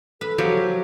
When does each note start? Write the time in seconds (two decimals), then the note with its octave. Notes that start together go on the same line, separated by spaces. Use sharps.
0.21 A4 B4
0.38 F3 F#3 G4